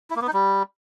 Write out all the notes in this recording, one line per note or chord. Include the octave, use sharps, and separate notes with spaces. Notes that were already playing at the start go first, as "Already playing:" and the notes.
E4
A#3
B3
D#4
G3